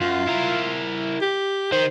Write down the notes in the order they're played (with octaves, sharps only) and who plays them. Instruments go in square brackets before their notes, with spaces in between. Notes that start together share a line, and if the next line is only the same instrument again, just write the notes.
[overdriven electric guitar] F#2 [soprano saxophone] F4
[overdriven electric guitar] E4 A#4
[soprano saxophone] G4
[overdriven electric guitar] D#3 [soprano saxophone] C5